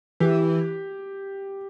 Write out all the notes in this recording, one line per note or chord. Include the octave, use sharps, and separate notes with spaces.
E3 G4